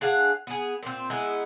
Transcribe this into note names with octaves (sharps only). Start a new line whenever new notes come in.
D4 G#4 F5 F#5
B3 G#4
A#2 C4
G#3 B3 D#4 E4